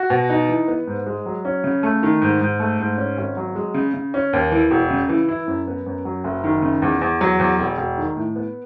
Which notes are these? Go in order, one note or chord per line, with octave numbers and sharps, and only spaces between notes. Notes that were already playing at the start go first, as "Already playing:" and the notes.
Already playing: F#4
B2
D#4
E3
B3
G#2
G#3
F#3
C#4
C#3
A3
D#3
G#2
G#2
A3
G#2
C#4
G#1
F#3
G#3
C#3
C#3
C#4
D#2
E3
E1
C#3
E3
E4
F#2
B3
F#2
F#3
F#1
D#3
C#3
E2
E2
F#3
E2
E1
E1
D#3
A2
B3